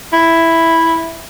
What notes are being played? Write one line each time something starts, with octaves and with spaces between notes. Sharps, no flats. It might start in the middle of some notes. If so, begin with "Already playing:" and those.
E4